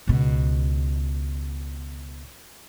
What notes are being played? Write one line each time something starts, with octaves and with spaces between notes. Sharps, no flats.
C#2 B2